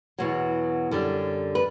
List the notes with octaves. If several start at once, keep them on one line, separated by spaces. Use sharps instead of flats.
E2 B2 F#3
F#2 D3 G3
B4